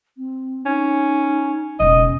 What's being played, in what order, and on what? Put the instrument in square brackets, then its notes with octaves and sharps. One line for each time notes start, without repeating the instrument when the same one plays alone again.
[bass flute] C4
[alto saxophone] C#4 [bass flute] D#4
[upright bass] E1 C#3 [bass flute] C#4 [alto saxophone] D#5